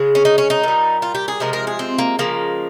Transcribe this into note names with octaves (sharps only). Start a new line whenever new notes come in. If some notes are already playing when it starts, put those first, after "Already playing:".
Already playing: C#3 G#3
C#4
D#4
C#4
D#4
A#2 G3
F4
G4
G#4
C3 F3 G#3 A#4
A#4
G#4
C4
A#3
C#3 F3 G#3 A#3